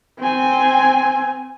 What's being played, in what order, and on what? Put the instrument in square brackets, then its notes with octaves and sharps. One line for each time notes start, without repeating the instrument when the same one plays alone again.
[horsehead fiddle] C4 G#5